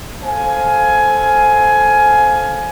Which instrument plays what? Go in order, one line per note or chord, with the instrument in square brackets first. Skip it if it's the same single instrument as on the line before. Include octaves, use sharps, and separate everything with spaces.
[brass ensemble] A4 C5 F5 G#5